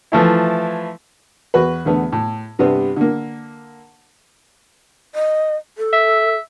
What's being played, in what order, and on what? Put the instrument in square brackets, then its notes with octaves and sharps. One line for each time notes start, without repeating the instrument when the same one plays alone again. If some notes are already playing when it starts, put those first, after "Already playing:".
[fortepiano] E3 F3 A3 E4
E2 F#4 B4
E2 D3 A3 B3
A2
G2 C3 G3 B3 D4
D3 A#3
[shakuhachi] D#5
A4
[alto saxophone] E5